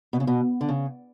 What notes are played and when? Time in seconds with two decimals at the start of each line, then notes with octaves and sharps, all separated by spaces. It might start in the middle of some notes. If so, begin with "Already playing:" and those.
0.13 B2
0.20 C#3
0.27 B2
0.61 D3
0.69 C#3